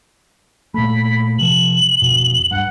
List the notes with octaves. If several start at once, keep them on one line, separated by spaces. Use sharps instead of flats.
A#2 A3 B5
C3 F3 F#7
F2 B2
G2 F#5